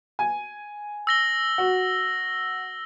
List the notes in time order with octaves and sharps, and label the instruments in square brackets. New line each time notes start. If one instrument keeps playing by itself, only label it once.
[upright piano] G#5
[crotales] E6 A#6 G7
[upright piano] F#4